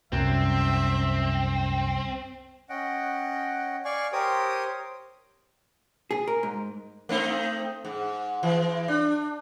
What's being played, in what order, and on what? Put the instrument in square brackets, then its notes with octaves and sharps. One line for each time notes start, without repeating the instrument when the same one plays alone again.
[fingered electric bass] C2 [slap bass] F#2 [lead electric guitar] C4 [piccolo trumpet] E5
[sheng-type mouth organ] C#4 D#5 F#5 G5
D5 F5 G#5 C#6
G4 A#4 C5 C#5 G5 D#6
[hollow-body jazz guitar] G#4
A#4
G#2
[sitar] A3 C4 D#4
G#2
E3
D4